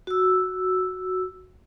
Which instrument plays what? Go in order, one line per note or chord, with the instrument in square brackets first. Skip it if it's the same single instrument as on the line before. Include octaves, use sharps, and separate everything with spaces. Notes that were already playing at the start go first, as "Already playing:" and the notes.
[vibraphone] F#4 E6